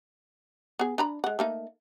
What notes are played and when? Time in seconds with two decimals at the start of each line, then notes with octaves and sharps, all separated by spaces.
0.79 B3 G#4
0.98 D4 A#5 B5
1.24 G#3 F#5
1.39 A3 A#3 D#4